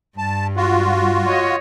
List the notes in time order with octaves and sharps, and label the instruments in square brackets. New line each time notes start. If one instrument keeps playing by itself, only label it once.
[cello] G2 G3 [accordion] A5
[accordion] F4 F#4
[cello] C#5 D#5